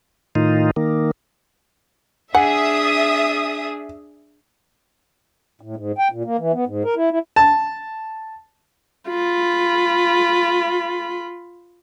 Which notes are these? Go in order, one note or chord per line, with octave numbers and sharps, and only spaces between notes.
A2 D#3 D#4 F4
D#3 A#3
D4 G#4 E5 F#5 G#5 D#6
A2
G#2
G5
A#2
A#3
E3
B3
G#2
A#4
E4
E4
A5
F4 B5